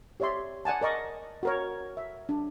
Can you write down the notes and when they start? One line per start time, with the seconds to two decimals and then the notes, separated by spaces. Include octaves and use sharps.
0.20 G4 C#5 D5 E5 C6
0.65 D5 F#5 G#5 A5
0.81 A#4 D5 D#5 C#6
1.43 F#4 A#4 C#5
1.97 E5
2.29 D4